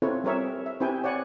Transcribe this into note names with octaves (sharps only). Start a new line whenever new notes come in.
C4 E4 F4 A4 B4 C#5
G3 C4 A#4 C#5 E5
E5
C4 E4 G4 B4 G5 G#5
C#5 D5 F#5 G#5